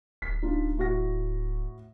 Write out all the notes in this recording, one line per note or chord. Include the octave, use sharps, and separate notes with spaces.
D1 B6
D4 D#4 F4
A2 F#4 A#6